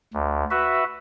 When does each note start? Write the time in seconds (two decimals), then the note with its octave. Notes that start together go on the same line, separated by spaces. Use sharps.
0.14 D2
0.50 F#4 B4 E5